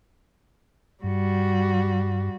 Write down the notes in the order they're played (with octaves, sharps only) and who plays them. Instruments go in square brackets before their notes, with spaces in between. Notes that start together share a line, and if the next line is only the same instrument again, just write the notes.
[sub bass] G2 [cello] G3 F#4